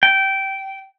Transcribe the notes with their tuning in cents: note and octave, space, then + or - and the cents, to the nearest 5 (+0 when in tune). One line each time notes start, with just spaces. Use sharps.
G5 -15